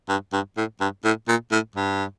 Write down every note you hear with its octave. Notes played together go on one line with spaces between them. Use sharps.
G2
G2
A2
G2
A2
A#2
A2
G2